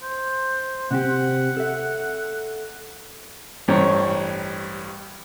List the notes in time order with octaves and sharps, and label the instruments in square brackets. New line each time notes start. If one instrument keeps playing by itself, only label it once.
[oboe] C5
[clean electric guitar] C3 C4 G4 [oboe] F#5
[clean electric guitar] A4 E5
[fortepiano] A1 G2 C5 C#5 A#5 C#6